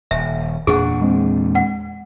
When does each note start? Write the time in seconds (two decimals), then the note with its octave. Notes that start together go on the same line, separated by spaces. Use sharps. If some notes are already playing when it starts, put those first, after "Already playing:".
0.11 D#1 E5
0.67 E2 A#2 D4 G#4 F#5 C#6
1.01 G#3 C4
1.55 F#5